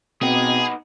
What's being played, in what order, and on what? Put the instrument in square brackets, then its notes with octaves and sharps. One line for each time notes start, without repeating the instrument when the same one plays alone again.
[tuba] B2 [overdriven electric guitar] B3 D#4 [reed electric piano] C4 G5 [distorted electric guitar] G#4